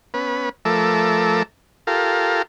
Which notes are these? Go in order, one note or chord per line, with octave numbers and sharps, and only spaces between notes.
B3 C#4 B4
F3 A3 A4 A#4 E5 D6
F4 G4 A4 A#4 F5